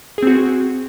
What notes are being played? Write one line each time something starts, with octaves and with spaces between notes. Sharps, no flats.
C4 F#4 G#4